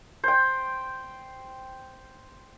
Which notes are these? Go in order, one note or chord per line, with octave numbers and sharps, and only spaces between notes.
C5 G5